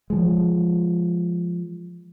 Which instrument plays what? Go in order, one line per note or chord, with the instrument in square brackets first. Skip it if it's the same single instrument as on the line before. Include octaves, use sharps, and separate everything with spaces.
[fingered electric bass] F3 G#3